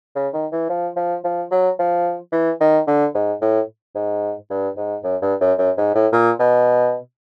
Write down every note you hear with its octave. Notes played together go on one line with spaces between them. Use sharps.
C#3
D#3
E3
F3
F3
F3
F#3
F3
E3
D#3
D3
G#2
A2
G#2
G2
G#2
F#2
G2
F#2
F#2
G#2
A2
A#2
B2